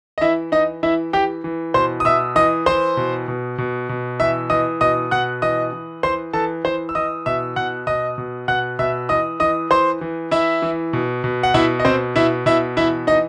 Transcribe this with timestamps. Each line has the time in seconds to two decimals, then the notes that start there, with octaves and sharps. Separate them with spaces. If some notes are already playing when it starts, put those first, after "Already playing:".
0.18 D#5
0.21 E3 E4 E5
0.52 E3 D#4 D#5
0.83 E3 E4 E5
1.13 E3 G4 G5
1.44 E3
1.74 B2 C5 C6
2.00 D#6
2.05 B2 E5 E6
2.36 E3 D#5 D#6
2.66 E3 C5 C6
2.97 B2
3.28 B2
3.58 B2
3.89 B2
4.20 E3 E5 E6
4.50 E3 D#5 D#6
4.81 B2 D#5 D#6
5.11 B2 F#5 F#6
5.42 E3 D#5 D#6
5.73 E3
6.03 E3 C5 C6
6.33 E3 A4 A5
6.65 E3 C5 C6
6.89 E6
6.95 E3 D#5 D#6
7.26 B2 E5 E6
7.56 B2 F#5 F#6
7.87 B2 D#5 D#6
8.18 B2
8.48 B2 F#5 F#6
8.79 B2 E5 E6
9.09 E3 D#5 D#6
9.40 E3 D#5 D#6
9.71 E3 C5 C6
10.01 E3
10.31 E3 E4 E5
10.62 E3
10.93 B2
11.24 B2
11.43 F#5
11.54 B2 E4 E5
11.80 D#5
11.85 B2 C4 C5
12.16 B2 E4 E5
12.46 B2 E4 E5
12.77 E3 E4 E5
13.07 E3 D#4 D#5